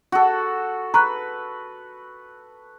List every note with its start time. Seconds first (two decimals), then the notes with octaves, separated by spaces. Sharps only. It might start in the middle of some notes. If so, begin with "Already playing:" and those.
0.12 F#4 A4
0.94 B4 A#5 C#6 F#6